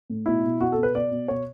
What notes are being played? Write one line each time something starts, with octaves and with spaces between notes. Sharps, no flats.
A2
B2 E4
B2
B2 F#4
A4
B2
B4
B2 D5
B2
B2 C#5